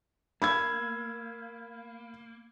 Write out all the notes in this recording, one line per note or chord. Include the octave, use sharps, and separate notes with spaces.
A#3 B5 E6 G#6